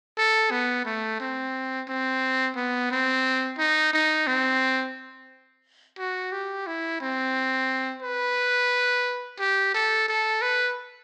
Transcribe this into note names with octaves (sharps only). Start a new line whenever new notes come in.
A4
B3
A3
C4
C4
B3
C4
D#4
D#4
C4
F#4
G4
E4
C4
B4
G4
A4
A4
B4